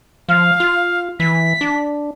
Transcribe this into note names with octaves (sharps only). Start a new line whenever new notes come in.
F3 F5
F4
E3 B6
D4